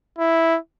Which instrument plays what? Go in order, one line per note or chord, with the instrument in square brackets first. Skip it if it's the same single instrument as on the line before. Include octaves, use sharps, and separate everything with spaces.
[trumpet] E4